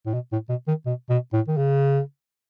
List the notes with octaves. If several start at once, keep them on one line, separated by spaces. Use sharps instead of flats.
A2
B2
A2
B2
D#3
B2
B2
A2
D#3
C#3